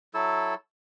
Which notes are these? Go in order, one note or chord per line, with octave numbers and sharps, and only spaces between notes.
F#3 E4 A4 E6